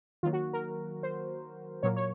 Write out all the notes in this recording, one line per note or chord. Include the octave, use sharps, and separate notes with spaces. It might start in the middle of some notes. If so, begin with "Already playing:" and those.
D#3 F#3 A#3 F4
F#4
A#4
C5
A#2 F#3 A#3 C#5
C#5